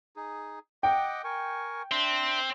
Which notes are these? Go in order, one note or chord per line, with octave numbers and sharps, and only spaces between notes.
D#4 G#4
D#5 F#5 G5 D6
A#4 G#5 C#6
C4 D4 E5 C6